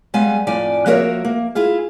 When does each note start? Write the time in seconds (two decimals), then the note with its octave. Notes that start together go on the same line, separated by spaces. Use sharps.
0.14 G3 G#3 B3 F5 G#5
0.47 F2 A2 F3 D5 G#5
0.86 F3 A#3 F#4 A#4 C#5 E5
1.25 A#3
1.55 E4 F4 G#4 F5